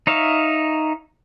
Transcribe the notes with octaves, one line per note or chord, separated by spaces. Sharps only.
D#4 C#5 E5 F5